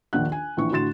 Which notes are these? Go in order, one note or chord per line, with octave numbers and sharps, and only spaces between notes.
A#1 D#2 D#3 D4 F#5 F#6
G#5
A#1 E3 C#6
A2 D3 F#4 C6 A6 E7